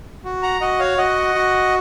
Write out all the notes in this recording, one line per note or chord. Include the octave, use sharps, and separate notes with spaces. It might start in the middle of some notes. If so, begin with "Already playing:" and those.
F#4
F#5 A#5
F#4 D#5 F#5
C#5 F5
F#4 D#5 F#5
F#4